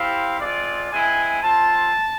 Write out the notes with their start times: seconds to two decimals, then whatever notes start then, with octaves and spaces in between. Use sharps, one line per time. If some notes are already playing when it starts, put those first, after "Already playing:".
Already playing: C4 E4 G4 F5
0.40 G#3 C4 F4 D5
0.92 G#3 C4 E4 G#5
1.42 C4 F4 A5